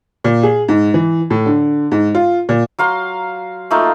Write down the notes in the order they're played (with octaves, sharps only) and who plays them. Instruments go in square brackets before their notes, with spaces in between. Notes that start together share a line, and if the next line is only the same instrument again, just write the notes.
[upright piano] A#2
G#4
G#2
E3
A2
D3
G#2
F4
A#2
[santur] F#3 F5 A#5 C6
A3 A#3 D#4 F4